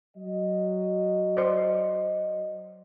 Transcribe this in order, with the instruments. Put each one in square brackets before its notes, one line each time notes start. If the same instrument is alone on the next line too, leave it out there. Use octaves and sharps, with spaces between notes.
[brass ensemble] F#3 D#5
[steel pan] C5 D5